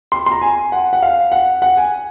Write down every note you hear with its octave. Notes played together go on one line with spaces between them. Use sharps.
C6
C6
A#5
G#5
F#5
F#5
F5
F#5
F#5
G#5